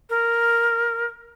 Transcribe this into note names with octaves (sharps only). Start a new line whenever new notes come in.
A#4